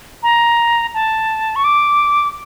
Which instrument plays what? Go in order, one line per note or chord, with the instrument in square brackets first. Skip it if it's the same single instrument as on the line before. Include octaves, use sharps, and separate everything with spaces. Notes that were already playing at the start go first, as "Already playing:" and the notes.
[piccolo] A#5
A5
C#6
D6